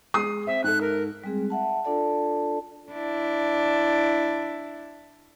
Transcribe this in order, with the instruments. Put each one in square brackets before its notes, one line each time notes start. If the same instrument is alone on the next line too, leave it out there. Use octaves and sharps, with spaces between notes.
[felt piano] G#3 D#6 C7
[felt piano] C4 [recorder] E5
[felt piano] G#2 A4 [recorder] F#6
[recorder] A#4
[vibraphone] G3 G#3 C4 G#4
E5 F#5 A5
D4 F4 A4 D5 A5
[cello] D4 E4